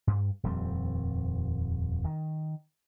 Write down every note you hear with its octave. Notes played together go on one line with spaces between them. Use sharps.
G2
D#1 F2 G3 C4
D#3